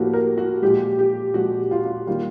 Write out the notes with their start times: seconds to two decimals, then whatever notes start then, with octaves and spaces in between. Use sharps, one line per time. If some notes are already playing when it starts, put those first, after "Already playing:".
Already playing: A2 F3 A#3 F#4 G4
0.13 A#4
0.38 F#4
0.62 A#2 F3 G#3 G4
0.99 G4
1.34 A#2 F3 G#3 F#4
1.71 F4
1.85 F4
2.07 D#3 G3 A#3 F4